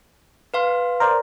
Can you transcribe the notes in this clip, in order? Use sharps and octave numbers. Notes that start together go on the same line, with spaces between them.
B4 F5 C6
A#4 C5 D5